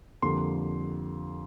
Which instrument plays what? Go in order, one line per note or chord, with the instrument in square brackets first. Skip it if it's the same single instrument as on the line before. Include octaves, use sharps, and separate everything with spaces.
[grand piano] F2 D3 G3 A#3 C6